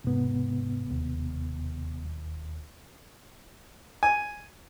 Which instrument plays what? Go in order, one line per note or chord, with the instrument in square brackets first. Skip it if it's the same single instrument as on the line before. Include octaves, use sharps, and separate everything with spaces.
[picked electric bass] E1 G#2 [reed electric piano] C3 B3
[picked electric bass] E1 D#2
[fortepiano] G#5